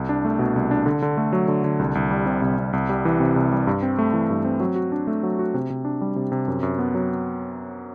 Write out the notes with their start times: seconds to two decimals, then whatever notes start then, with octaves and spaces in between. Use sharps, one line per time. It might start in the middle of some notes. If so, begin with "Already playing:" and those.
Already playing: C2
0.09 D4
0.25 A3
0.39 B2
0.56 C2
0.71 D4
0.86 D3
1.02 D3
1.17 A3
1.33 F#3
1.48 D3
1.64 D3
1.79 C2
1.95 C2
2.11 G3
2.26 C3
2.42 C2
2.58 C2
2.73 C2
2.89 G3
3.05 E3
3.20 C3
3.36 C2
3.52 G3
3.67 G2
3.83 C4
3.99 A3
4.13 E3
4.30 G2
4.45 C4
4.60 F#3
4.76 F#4
4.92 D4
5.07 A3
5.23 F#3
5.39 F#4
5.54 C3
5.70 C3
5.85 D4
6.01 G3
6.16 C3
6.32 C3
6.48 F#2
6.63 F#2
6.79 B3
6.95 F#3